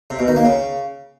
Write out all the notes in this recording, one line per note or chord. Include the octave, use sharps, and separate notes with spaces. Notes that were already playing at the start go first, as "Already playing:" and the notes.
C3
B2
D#3
A#3
C#3